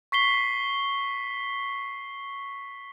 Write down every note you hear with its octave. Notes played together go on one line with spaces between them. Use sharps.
C#6 B6 C7 G7